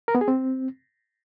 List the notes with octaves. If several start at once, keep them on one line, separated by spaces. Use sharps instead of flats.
A#4
B3
G#4
C4